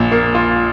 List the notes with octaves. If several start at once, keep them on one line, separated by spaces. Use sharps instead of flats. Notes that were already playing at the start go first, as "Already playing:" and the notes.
Already playing: A#1 A#2
A#3
F4